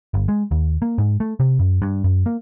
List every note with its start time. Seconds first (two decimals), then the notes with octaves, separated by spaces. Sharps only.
0.14 G1
0.28 G#3
0.51 D#2
0.82 A#3
0.98 G#2
1.20 A3
1.40 C3
1.59 F#2
1.82 G2
2.04 F#2
2.26 A#3